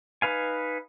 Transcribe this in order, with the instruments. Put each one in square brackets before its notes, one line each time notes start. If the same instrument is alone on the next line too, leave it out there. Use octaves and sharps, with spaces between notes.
[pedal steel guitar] D#4 B4 F5 G#5